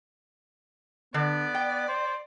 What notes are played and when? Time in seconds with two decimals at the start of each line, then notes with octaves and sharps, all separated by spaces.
1.14 D3 B3 D5
1.54 G5
1.88 C5